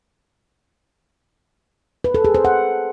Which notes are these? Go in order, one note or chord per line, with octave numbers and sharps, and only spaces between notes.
B4
A4
G#4
C5
F#5